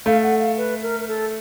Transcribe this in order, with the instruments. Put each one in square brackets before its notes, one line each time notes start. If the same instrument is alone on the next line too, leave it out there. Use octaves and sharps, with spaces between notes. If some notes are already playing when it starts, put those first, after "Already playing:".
[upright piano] A3 [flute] F5
[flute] F#5
F5
B4
A#4
A#4
A4